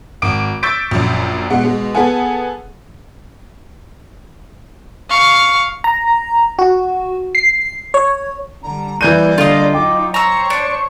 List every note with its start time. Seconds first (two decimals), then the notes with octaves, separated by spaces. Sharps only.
0.22 G#1 D6 D7
0.63 C#6 E6 G6 A6 B6 D7
0.91 A#1 F#2
1.50 B2 G#3 F#5
1.64 B2 G#3
1.95 B3 G#4 A4 F#5 G#5
5.10 F5 C#6
5.84 A#5
6.59 F#4
7.35 C7
7.94 C#5
8.63 D3 G3 A#5
9.01 E3 G3 A#3 D5 G6 D#7
9.38 D3 F4 D#5
9.74 F#3 D#4 G5 D6
10.14 C5 C#5 A#5 C#6 E6
10.50 D4